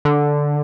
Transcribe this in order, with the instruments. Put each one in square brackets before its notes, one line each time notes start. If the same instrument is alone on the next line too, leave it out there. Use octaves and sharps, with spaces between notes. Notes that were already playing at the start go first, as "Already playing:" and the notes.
[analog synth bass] D3